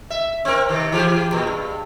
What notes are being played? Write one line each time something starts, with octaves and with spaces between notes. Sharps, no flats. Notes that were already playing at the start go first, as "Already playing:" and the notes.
E5
C4 A#4
C3 D#3
E3 G4 G#4
A#2
G2